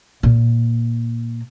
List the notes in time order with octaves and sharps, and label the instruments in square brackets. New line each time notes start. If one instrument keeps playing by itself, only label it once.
[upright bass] A#2 A#3